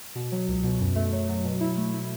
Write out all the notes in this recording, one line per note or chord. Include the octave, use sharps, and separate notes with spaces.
B2
F#3
C#2
B2
F#2
A3
F#3
F#3
B2
E4
A3
E4